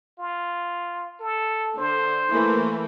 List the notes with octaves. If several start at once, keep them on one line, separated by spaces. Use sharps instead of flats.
F4
A4
D3 C5
E3 A3 A#3